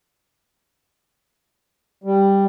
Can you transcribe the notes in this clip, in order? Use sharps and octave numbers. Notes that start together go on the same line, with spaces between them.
G3